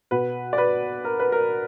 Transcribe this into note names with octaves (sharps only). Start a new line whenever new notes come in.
B2 B4
D5
B4
A#4
B4
A#4